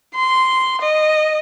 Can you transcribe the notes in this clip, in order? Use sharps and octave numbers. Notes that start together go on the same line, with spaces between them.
C6
D#5